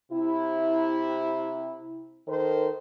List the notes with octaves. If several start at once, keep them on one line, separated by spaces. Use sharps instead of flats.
C3 E4
D#3 A4 A#4 C5